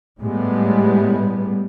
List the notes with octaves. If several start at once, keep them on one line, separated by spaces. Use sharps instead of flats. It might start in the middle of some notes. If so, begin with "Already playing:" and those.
A2 G3 G#3 B3